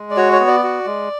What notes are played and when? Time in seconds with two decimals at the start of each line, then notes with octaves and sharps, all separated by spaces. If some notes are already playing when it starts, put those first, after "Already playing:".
Already playing: G#3
0.11 D5
0.17 F#4 C#5
0.33 C#5
0.40 B3
0.47 D5
0.63 F#4
0.86 G#3